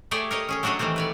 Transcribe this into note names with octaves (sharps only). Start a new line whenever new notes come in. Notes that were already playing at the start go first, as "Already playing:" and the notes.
A3 E4 G4 G#4 C#5 D5
A#4 C#5 D#5
C#4 G#4 C#5
F#3 A3 D4 F#4 C#5 D#5
D#3 E3 G3 A3 C4
B4 C#5 D5